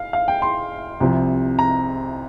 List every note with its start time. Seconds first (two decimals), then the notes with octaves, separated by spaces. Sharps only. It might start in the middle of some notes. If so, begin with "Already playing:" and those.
Already playing: F5
0.13 F5
0.28 G5
0.42 C6
1.00 C2 C3 F3
1.59 A#5